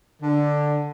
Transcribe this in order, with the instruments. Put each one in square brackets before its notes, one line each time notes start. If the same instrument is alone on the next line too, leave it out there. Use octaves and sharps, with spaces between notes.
[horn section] D3